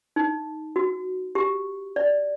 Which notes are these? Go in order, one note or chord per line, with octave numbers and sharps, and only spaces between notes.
D#4
F#4
G4
D5